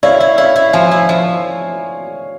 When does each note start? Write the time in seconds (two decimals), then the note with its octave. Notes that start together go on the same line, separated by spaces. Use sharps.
0.03 E4 C#5 F5
0.20 E4
0.38 E4 C#5 F5
0.56 E4
0.73 F3 F5 G#5
0.91 E4
1.09 F3